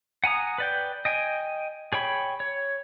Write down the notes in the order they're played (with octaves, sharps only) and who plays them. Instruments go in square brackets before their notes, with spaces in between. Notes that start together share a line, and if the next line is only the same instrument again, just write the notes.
[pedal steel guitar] F#5 G#5 A#5 D#6
B4 D5 G5
D#5 G5 G#5
G#4 C#5 G5 B5
C#5